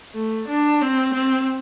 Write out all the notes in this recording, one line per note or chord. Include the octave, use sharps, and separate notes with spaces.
A3
D4
C4
C4